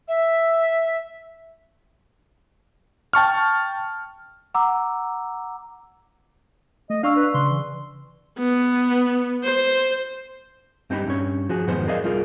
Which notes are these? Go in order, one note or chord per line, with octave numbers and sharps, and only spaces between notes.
E5
G5 A5 C#6 F6
F#5 A#5 D6 E6
A3 D#5
D4 D5 F5 C#6 E6
B4
C#3 C6
E3
B3
C5
G2 C4 D#4 G4 B5
G2 C#4 C#5
F3 F#4 G#4
F2 G#2 D#3 F#3 B3 C5
G#4 A#4 D5 D#5 F5
C2 G3 F4 G#4 A#4